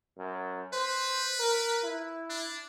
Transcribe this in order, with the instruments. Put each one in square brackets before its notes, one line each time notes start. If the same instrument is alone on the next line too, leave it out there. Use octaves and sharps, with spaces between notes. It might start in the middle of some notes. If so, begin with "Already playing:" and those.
[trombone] F#2
[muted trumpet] B4 [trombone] C5
[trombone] A#4
E4
[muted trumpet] D4